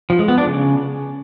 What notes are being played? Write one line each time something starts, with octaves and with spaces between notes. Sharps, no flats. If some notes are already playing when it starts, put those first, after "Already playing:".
F3
G#3
B3
D4
C#3